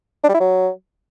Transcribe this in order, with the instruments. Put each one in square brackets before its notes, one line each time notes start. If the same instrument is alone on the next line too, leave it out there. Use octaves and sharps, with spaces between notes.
[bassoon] D4
G3
E4
F#3